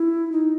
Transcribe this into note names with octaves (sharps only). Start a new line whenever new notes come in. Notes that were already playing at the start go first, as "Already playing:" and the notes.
Already playing: E4
D#4